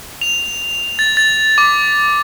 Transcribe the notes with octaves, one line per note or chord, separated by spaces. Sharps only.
F7
A6
A6
D6